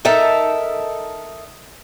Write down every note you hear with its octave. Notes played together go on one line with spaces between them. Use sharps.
D#4 A4 A#4 E5